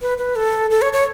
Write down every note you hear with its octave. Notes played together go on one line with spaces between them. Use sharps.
B4
B4
A4
A4
C#5
C#5